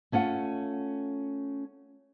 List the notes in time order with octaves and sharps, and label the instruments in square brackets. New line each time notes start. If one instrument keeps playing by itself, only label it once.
[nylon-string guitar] A3 C#4 F4 F#5